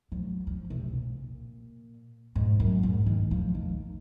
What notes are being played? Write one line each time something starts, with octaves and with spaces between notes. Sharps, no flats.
F3
F#3
F3
C3
A#2
G#2
F#2
G#2
D#3
F3
D#3